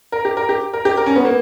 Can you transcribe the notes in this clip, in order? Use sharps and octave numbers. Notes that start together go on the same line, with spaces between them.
A#4
G4
A#4
G4
A#4
G4
A#4
C#4
B3
A#3